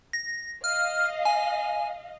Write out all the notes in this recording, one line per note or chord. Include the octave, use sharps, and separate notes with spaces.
A#6
D#5 F5 F6
G#5